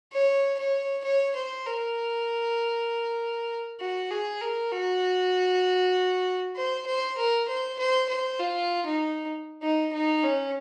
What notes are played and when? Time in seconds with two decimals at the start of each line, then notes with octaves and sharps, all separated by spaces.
0.13 C#5
0.59 C#5
1.04 C#5
1.35 C5
1.66 A#4
3.80 F#4
4.11 G#4
4.41 A#4
4.72 F#4
6.56 C5
6.86 C5
7.17 A#4
7.48 C5
7.79 C5
8.09 C5
8.40 F4
8.86 D#4
9.62 D#4
9.93 D#4
10.23 C#4